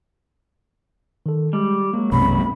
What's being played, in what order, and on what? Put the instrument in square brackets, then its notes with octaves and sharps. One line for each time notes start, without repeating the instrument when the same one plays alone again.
[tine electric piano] D#3 A4
[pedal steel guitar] G3 [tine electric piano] G#3
[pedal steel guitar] F#3 [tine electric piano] G#3 A#3
[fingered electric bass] B1 F#2 C3 [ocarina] B5